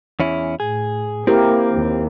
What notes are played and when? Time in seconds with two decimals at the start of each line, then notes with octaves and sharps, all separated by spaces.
0.20 E2 C#4 E4
0.60 A2 G#4
1.27 A#3 C4 E4 G4 A#4
1.72 D#2